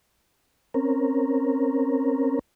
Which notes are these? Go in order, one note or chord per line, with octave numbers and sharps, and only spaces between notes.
C4 C#4 A#4